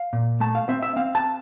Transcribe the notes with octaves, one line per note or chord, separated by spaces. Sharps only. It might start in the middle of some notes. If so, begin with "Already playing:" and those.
Already playing: F5
A#2
A3 A5
F5
C4 E5
E5
C4 F5
A5